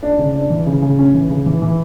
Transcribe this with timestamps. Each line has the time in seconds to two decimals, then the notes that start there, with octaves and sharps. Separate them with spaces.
0.03 D4
0.18 C#3
0.35 D4
0.50 E3
0.66 C#3
0.82 C#3
0.99 C#4
1.14 E3
1.30 C#3
1.46 E3
1.62 E3